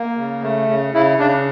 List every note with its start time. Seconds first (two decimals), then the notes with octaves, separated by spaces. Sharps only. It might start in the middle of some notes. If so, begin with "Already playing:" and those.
Already playing: A#3
0.17 C#3
0.43 A3
0.69 C#3
0.94 C#3 E4
1.19 C#3 D4